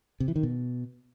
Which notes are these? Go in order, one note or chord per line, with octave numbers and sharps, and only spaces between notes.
C3
E3
D#3
B2